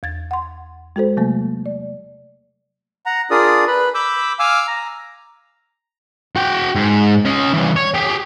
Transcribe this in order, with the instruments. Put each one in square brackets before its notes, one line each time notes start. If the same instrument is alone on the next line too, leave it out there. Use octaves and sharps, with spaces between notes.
[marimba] E2 G#6 A6
F#5 C6
G#3 F#4 A4 C5
C3 F#3 A3 A#3
D5
[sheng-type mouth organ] F#5 A#5
D4 F4 G#4 A#4 D5 D#6
B4 B5
B5 D6 E6 G6
F5 G#5 D6 E6 F6
A#5
[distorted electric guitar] F#4 G5
G#2
C#4 D#5
E3 G3
C#5
G4 G#4